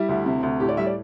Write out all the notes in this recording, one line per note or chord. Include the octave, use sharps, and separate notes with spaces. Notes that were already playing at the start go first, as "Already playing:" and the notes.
Already playing: G3 E4
D2
C3
D2
A2 G4
D5
G3 E5
D5